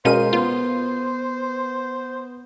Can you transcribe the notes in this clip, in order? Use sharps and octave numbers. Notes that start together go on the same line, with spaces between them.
B2 G#3 C#4 A#4 C5 F5 D#7
B3 F4